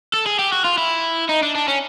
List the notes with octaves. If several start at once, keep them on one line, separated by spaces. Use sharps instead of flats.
A4
G#4
G4
F#4
F4
E4
D#4
D4
D4
C#4